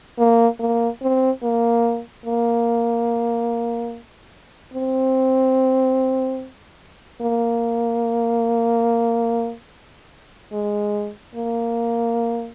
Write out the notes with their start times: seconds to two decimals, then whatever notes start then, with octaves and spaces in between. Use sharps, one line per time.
0.19 A#3
0.60 A#3
1.02 C4
1.43 A#3
2.26 A#3
4.74 C4
7.21 A#3
10.53 G#3
11.35 A#3